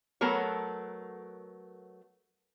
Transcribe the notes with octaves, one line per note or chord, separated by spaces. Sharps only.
F#3 A3 B3 A4 A#4 C#5